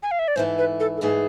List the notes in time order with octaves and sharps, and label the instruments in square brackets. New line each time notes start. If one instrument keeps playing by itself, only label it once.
[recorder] G#5
F5
E5
D5
[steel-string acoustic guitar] G#2 E3 A3 E4 [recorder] C5
[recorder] B4
A4
A4
[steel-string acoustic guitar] G#2 E3 A3 E4 [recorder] G#4